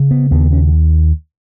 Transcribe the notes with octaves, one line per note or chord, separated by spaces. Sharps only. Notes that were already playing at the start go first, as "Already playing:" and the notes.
Already playing: C#3
B3
D#2 B3
C#4